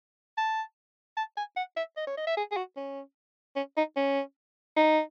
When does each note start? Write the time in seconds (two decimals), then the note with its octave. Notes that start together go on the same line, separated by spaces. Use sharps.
0.38 A5
1.17 A5
1.37 G#5
1.57 F#5
1.77 E5
1.97 D#5
2.07 C#5
2.17 D#5
2.27 E5
2.37 G#4
2.52 G#4
2.57 F#4
2.77 C#4
3.56 C#4
3.77 D#4
3.96 C#4
4.76 D#4